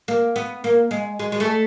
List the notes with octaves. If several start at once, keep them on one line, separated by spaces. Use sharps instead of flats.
A#3
B3
A#3
G#3
G#3
G#3
A3